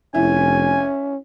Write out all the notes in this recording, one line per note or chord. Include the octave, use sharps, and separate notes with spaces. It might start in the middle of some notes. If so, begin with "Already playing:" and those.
F1 C#4 E4 G#5